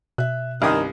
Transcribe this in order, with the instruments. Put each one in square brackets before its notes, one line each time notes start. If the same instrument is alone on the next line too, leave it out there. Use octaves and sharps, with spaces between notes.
[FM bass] B2 [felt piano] E5 F#6
[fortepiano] C2 D#6 [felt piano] G2 C#4 G#6 [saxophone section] D#3